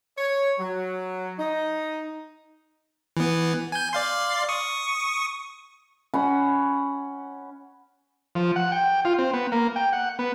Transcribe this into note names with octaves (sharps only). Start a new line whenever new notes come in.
C#5
F#3
D#4
E3 B3
G#5 G6
D5 F5 C6
C#6 D#6
C#4 F#5 B5
F3
F#5
G5
F4
C4
B3
A#3
G5
F#5
B3